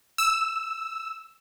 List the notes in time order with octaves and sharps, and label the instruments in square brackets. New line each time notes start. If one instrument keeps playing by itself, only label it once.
[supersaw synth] E6